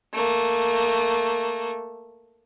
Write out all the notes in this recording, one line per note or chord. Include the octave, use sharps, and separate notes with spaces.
A3 A#3